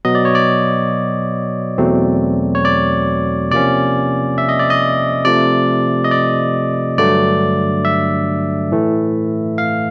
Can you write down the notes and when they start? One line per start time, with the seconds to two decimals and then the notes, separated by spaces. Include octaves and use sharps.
0.05 B2 F#3 B3 D#5
0.15 D5
0.25 C#5
0.35 D5
1.78 E2 B2 F#3 A3 C4
2.55 C#5
2.65 D5
3.51 C3 F3 A#3 C#4 D5
4.38 E5
4.49 D#5
4.59 D5
4.70 D#5
5.25 C3 F3 A3 D5
6.04 D#5
6.11 D5
6.98 G2 D3 F#3 A3 D5
7.85 E5
8.72 A2 E3 A3
9.58 F5